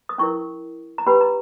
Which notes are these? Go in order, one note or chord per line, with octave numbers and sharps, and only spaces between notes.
D#6
C#4 E4 A#4 C#6
A#5
C#4 G4 B4 B5
A#5